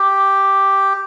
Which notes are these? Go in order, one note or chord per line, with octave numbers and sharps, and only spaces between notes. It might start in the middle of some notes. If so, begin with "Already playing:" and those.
Already playing: G4